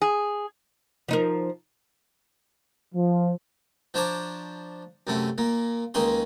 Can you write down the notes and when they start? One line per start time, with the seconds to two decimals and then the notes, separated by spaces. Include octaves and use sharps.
0.02 G#4
1.08 F3 D#4 A#4
2.95 F3
3.94 F3 D4 C5 C#5 A#5 D6
5.07 F#2 C3 A3 C#4
5.38 A#2 A#3
5.94 C#2 D#3 A#3 C#4 G#4 C6